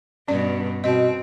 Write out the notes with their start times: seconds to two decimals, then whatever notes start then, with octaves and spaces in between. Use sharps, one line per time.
0.28 G2 B2 C#4 D5
0.84 B2 C4 D#5